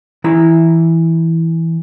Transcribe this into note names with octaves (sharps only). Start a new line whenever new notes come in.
E3 E4 A#5